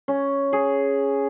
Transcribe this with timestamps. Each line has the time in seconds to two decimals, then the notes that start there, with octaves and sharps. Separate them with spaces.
0.08 C#4
0.53 G#4